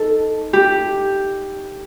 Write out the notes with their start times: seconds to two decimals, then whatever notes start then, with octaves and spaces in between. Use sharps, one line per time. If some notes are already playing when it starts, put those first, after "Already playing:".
Already playing: D#4 A4
0.53 G4